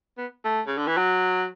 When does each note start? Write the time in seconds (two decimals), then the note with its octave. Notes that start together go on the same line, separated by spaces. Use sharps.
0.18 B3
0.45 A3
0.67 C#3
0.78 D3
0.87 E3
0.97 F#3